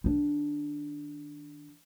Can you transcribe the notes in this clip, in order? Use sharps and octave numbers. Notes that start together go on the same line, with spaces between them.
D#3 D4